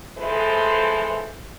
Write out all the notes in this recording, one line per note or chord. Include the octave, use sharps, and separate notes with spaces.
E3 F3 G#3 A4 B4 C5